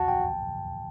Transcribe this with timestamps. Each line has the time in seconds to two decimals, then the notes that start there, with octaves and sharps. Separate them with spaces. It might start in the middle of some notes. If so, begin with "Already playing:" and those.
Already playing: F#4 A5
0.08 G5